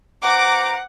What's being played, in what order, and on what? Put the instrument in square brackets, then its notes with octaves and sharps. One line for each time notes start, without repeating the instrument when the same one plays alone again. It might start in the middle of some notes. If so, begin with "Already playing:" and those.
[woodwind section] G2 C5 A#5 [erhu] F#5 [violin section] D6